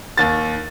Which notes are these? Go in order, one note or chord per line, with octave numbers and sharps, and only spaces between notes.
D#2 A6